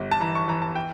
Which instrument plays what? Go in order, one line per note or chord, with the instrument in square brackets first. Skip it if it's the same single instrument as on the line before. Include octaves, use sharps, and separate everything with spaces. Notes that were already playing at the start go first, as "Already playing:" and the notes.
Already playing: [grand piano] G1 G3
A5
E3 A#5
C#6
E3 A#5
A5
G5